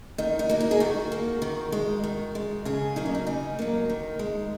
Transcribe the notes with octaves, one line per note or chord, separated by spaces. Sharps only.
D#3 D#4
D#4
A#3 F#4
D#4
G#4
D#3 F#4
A#3
D#3
G#3
D#3
G#3
C#3 G#4
F#3 A#3 D#4
C#4
D#4
C#3 D#4
F#3 A#3
D#3
G#3